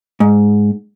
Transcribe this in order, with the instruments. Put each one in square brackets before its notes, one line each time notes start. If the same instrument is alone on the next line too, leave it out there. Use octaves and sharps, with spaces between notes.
[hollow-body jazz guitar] G#2